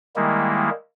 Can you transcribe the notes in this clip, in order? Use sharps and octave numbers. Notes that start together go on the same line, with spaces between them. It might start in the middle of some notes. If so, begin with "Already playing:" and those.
D#3 G3 G#3 A#3 E4